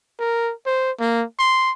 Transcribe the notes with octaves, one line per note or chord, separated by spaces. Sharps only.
A#4
C5
A#3
C6